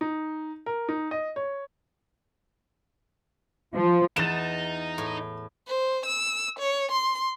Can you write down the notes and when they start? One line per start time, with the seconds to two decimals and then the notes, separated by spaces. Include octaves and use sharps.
0.01 D#4
0.66 A#4
0.89 D#4
1.11 D#5
1.36 C#5
3.74 F3
4.16 E2 D#4 A6 E7
4.98 A2
5.67 C5
6.05 E6
6.59 C#5
6.91 C6